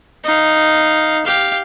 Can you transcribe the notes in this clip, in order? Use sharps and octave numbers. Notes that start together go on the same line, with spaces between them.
D#4 F5
G4 F5